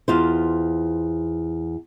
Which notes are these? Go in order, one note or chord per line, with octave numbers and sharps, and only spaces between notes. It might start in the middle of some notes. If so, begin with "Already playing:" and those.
E2 F4 C5